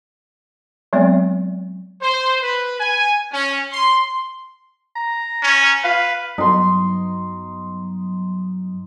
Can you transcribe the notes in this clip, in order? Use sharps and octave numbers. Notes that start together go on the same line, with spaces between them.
F#3 G#3 B3 C4 D5
C5
B4
G#5
C#4
C6
A#5
C#4
B4 F5
G2 F#3 B3 D#4 C6